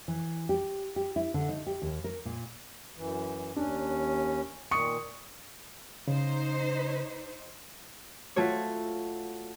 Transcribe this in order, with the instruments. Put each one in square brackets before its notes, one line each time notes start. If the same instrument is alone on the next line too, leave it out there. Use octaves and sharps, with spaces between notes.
[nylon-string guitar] E3
G4
G4
E4
D3
D#4
G4
D#2
A#4
A#2
[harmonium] F#2 E3
[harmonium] D#2 C#4 [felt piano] D4
[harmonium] A#2 D#3 [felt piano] C#6 D#6 C#7
[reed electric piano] C#3 [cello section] D#4 C5
[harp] A3 F4 F#4 C#5